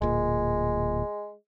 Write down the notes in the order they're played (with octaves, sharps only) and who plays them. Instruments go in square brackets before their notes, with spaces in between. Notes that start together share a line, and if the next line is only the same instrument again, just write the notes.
[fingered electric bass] D1 A#2 [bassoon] G#3